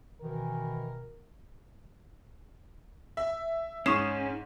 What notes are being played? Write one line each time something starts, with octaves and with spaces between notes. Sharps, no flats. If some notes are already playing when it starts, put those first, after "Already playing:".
B2 D#3 E3 A#4
E5
G#2 C#4 C#6 D#6 C7 E7